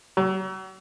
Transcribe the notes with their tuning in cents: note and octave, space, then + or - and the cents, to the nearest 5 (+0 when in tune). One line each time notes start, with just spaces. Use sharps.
F#3 +35